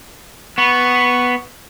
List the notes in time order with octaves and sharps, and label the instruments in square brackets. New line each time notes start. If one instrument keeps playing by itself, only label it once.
[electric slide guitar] B3 [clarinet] C#6